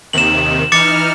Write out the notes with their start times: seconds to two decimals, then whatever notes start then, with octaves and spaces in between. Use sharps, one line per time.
0.13 D#2 C3 D#3 E7 F#7
0.72 E3 D#4 D6 F6 A6 C#7